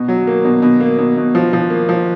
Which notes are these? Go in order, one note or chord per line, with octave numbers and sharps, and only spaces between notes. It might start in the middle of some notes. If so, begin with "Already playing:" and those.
Already playing: B2
F#3
A#3
B2
B2
A#3
B2
B2
F3
F3
A#3
F3